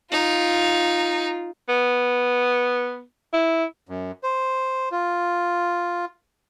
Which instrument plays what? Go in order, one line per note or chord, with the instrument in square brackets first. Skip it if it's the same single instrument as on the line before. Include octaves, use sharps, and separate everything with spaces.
[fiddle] D#4 [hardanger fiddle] F4
[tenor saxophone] B3
E4
[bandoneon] F#2
C5
F4